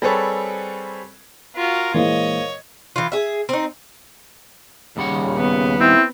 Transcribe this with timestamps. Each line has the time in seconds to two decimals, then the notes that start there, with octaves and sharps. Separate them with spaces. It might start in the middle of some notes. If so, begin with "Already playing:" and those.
0.02 G3 C4 G#4 A4 B4 C#5
1.55 F4 F#4 A#4
1.94 A#2 E3 G#3 A#4 C5 C#5 D#5 F5
2.96 E3 F4
3.12 G#4 E5
3.49 C4 D#4
4.97 D#2 C#3 G3 F#5
5.37 B3
5.80 C4 E4